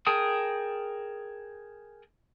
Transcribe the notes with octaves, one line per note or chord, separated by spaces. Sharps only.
G#4 A#4 G5 A5 D#6